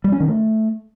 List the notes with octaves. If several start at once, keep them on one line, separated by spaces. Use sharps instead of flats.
G3
C#4
D#3
A3